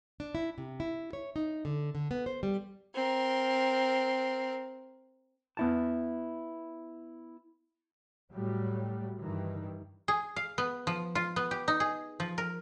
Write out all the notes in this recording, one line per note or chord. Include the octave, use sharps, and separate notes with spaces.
D4
E4
C3
E4
C#5
D#4
D3
D3
B3
C5
G3
C4 A#4
B3 E4 A5
A2 F#3 G3
G2 D#3 E3
G#4
F5
B3
F3
F4
B3
G4
D#4
G#4
F3
A#4